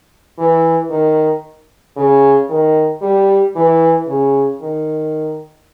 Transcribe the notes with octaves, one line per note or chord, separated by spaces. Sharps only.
E3
D#3
C#3
D#3
G3
E3
C#3
D#3